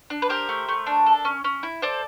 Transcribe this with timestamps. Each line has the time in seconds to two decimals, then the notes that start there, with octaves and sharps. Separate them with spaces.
0.10 D4
0.22 B4
0.29 G4 A#4 C5
0.49 A3
0.69 A3
0.86 D4
1.06 A4
1.25 C#4
1.44 C#4
1.63 E4
1.82 A4 C5 D5